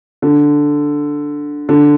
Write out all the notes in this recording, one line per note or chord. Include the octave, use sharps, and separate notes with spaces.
D3
D3